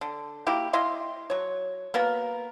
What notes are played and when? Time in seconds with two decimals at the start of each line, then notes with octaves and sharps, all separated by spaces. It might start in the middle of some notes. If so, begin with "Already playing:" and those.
0.01 D3
0.47 A#3 E4 F#4 G4
0.73 E4 D#5 F5 C6
1.30 F#3 C#5
1.94 A#3 B3 F#4 A#4